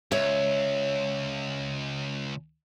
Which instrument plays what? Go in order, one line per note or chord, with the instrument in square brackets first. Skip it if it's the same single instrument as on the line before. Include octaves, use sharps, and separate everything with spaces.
[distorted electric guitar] C#2 [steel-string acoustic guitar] C#5 E5